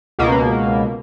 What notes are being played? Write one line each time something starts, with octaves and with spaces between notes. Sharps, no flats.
C#2 B2 A#3